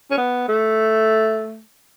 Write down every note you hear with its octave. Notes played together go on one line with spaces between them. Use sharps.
C#4
B3
A3